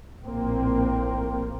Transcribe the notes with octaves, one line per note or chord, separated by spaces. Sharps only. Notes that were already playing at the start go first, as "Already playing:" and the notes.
A#1 A2 A#3 C4